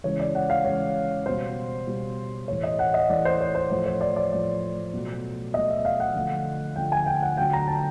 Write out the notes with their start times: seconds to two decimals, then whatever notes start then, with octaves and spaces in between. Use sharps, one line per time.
0.04 C#3 E3 G#3 C#5
0.20 D5
0.35 F#5
0.50 F5
0.64 C#3 E3 G#3 C#5
1.26 B2 G3 C5
1.87 B2 G3
2.48 A2 E3 A3 C#5
2.63 D#5
2.79 F#5
2.94 D#5
3.09 A2 E3 A3 D5
3.25 C5
3.40 C#5
3.55 C5
3.70 A2 F3 A3 C5
3.86 C#5
4.01 D5
4.16 D5
4.32 A2 F3 A3 D5
4.94 B2 F#3 A3
5.54 B2 F#3 A3 D#5
5.70 E5
5.85 F5
6.00 F#5
6.15 D3 F3 A3
6.76 D3 F3 A3 G5
6.92 G#5
7.06 G5
7.23 F#5
7.37 D3 F#3 A3 G5
7.53 A#5
7.68 A5